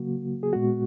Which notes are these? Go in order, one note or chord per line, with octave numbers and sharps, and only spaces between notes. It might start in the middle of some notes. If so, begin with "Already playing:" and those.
Already playing: C#3 F#3 A#3 F#4
G#4
A#2 G#3 B3 F#4